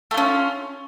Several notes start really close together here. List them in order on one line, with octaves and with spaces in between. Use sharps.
A3 F4 C#4